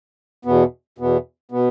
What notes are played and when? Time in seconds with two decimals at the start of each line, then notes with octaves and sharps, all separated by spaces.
0.45 E2 B2 B3
0.98 E2 B2 B3
1.51 B2 B3